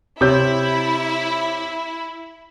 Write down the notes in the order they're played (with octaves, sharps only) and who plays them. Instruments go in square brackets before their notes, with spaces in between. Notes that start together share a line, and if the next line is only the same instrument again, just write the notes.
[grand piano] C3 C#5 G6 [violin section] E4